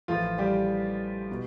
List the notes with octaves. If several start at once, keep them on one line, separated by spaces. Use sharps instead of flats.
A1 A2 F3 A3 F4
G3 G4
B2